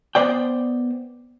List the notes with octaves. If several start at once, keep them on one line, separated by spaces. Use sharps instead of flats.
B3 C5 D5 G5